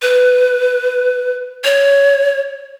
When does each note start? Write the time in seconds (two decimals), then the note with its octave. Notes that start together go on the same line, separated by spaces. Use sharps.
0.02 B4
1.64 C#5